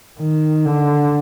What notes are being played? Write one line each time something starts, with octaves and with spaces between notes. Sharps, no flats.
D#3
D3